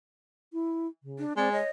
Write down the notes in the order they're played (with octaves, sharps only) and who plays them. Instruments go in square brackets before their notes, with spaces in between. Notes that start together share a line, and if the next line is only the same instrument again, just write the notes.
[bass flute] E4
C#3
[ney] D4
[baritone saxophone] G#3 [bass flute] C4 [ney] D5
[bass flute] C#5 [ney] D#5